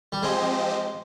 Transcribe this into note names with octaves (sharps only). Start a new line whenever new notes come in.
G3
F3 G#3 C4 G4 C5 D#5